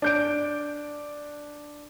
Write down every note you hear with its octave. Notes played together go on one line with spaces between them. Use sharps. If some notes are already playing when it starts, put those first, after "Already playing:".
D4 G6 D7